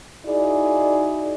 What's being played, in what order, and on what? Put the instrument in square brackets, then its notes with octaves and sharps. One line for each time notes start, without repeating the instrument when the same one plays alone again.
[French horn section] D#4 E4 F#4 G#4 D5